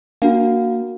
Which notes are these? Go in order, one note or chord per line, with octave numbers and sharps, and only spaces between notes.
A#3 D4 F#4 F5